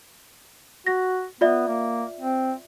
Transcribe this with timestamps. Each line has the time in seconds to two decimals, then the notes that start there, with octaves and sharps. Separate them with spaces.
0.87 F#4 A#6
1.41 B3 F4 D5 E5
1.68 A#3
2.21 C4